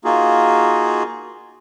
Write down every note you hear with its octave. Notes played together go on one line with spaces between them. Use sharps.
A#3 D#4 F4 F#4 G#4